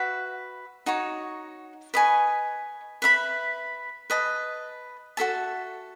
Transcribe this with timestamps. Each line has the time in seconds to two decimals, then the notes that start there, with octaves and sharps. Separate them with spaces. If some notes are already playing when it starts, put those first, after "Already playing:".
Already playing: F#4 B4 E5
0.86 D#4 F#4 C#5
1.94 B4 D#5 G#5 C#6
3.02 B4 E5 B5
4.10 B4 D#5 A5
5.17 F#4 A4 E5 A5